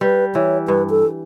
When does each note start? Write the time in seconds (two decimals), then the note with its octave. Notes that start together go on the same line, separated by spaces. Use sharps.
0.01 G3 B4
0.35 E3 C#5
0.68 G2 B4
0.90 A4